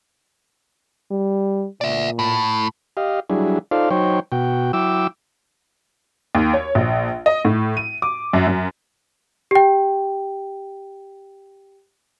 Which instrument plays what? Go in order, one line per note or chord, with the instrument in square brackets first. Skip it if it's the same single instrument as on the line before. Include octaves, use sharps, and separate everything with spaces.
[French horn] G3
[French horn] A#2 [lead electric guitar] D5 E5
[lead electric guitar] A2
[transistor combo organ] G4 D#5 F5
F#3 G3 D4 E4 G#4
D#4 F4 A4 C5 D5 F5
F#3 D#4 C5 C#5 G5
B2 F#4 G5
F#3 E4 G5 D6 E6
[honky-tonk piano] D#2
C#5
A#1
D#5
A2
D#7
D6
F#2
F#2
[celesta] G4 G5